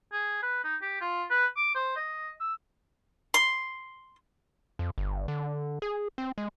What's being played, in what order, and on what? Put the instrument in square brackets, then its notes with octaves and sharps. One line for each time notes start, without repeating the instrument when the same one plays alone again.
[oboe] G#4
B4
D#4
G4
F4
B4
D6
C5
D#5
E6
[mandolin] C6
[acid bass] F2
G1
D3
G#4
C4
G#3